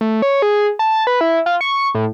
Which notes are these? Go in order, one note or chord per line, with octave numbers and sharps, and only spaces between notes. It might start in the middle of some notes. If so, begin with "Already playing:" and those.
A3
C#5
G#4
A5
B4
E4
F4
C#6
A2